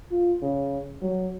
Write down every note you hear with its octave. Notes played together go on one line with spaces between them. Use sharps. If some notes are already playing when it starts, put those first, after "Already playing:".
F4
C#3
F#3